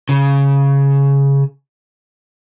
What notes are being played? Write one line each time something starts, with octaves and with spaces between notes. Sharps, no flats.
C#3